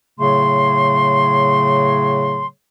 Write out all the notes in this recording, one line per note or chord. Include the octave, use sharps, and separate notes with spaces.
A2 C#3 F#3 A3 G#4 C6